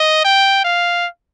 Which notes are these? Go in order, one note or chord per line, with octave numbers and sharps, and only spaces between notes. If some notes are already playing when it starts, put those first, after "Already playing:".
Already playing: D#5
G5
F5